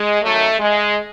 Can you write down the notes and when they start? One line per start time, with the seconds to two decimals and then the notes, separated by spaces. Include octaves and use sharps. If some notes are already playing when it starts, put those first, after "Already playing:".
Already playing: G#3
0.23 F#2 D#3 F#3 A3
0.59 G#3